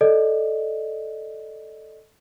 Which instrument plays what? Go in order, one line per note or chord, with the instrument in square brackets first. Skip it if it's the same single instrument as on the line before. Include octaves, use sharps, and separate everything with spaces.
[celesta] A4 D5 D#5